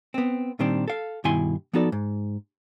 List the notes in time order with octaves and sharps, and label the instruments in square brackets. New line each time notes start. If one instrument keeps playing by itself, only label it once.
[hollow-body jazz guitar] B3 C4
A#2 D#3 G3 C4 D4
A4 F5
G2 B2 D#3 E4 G#5 C6
F3 B3 D#4 F#4 A4 D5
G#2